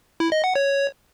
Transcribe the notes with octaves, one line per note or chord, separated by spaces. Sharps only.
E4
D#5
F#5
C#5